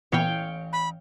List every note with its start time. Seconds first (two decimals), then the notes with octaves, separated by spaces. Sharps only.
0.12 A1 A#2 E3 B3 C#5 F5 G5
0.73 B5